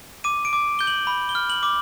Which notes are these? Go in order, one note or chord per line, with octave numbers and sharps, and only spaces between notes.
D6 D#7
D7
D6
G6 G7
F#7
B5
G7
F6
F#7
D6